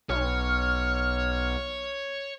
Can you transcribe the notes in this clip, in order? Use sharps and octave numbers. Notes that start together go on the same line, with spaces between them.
B1 C#5 F6